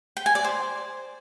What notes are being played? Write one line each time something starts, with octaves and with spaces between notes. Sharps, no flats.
G5
G#5
D5
C5